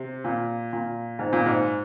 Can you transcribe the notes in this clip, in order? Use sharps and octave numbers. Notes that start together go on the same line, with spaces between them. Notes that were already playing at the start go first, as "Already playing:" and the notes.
Already playing: C3
A#2
A#2
G#2
A#2
G#2